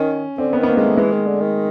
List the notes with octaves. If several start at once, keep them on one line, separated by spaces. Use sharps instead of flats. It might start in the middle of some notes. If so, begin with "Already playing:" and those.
Already playing: D#3 C#4
D3 C4
B3
D#3
B3
A#3
D#3 G#3
A3
E3 G#3
D#3
D3
D#3